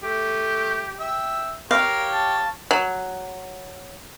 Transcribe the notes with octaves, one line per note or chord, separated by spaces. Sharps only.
A3 G4
E5 G5
G4 A#4 C#5 F5
A5
F#3